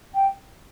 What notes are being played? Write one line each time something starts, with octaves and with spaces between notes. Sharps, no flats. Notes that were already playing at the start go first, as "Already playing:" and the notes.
G5